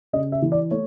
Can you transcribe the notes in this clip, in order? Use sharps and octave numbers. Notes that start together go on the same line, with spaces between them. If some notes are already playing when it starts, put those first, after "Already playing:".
C#3 D#5
E5
E3
D5
A3 C#5